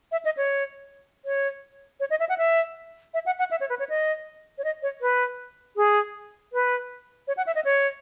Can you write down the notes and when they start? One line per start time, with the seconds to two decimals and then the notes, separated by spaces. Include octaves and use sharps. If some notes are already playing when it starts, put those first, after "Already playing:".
0.12 E5
0.25 D#5
0.37 C#5
1.25 C#5
2.00 C#5
2.10 D#5
2.20 E5
2.29 F#5
2.38 E5
3.14 E5
3.26 F#5
3.39 F#5
3.51 E5
3.61 C#5
3.69 B4
3.79 C#5
3.89 D#5
4.58 C#5
4.64 D#5
4.82 C#5
5.01 B4
5.77 G#4
6.53 B4
7.28 C#5
7.37 F#5
7.47 E5
7.55 D#5
7.65 C#5